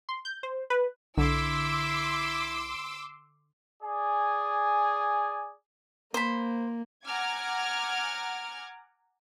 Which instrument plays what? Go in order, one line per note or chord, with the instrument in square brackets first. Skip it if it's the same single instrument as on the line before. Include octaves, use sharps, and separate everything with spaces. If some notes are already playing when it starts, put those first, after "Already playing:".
[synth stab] C6
G6
C5
B4
[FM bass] B1 [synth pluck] D3 [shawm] E4 [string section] C6 D6 E6
[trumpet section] G#4 D5 G#5
[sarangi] A#3 [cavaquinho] C5 B5
[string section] F#5 G#5 A#5 D6 F6 G#6